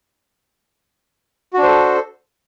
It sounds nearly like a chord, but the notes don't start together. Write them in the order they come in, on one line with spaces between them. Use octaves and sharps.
F#4 D4 C5 A4